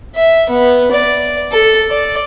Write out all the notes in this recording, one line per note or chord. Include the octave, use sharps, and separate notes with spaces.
E5
B3
D5
A4
D5